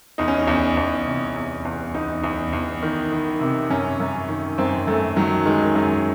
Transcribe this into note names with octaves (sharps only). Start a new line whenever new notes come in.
E2 D#4
C#4
D#4
E2
E2
C3
E2
E2
E2 D#4
E2
E2
D#3
D#3
C3
F#2 C#4
F#2
D#3
F#2 C4
F#2 A3
D#3 F#3
D#3 G#3
F#2